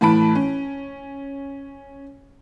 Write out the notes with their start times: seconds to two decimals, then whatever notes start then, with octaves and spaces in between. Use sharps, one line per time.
0.01 A2 E3 A5 B5 D7
0.35 C#4